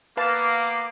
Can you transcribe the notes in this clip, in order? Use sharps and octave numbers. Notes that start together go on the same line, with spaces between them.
A#3 B3 B4 F5 A5 D6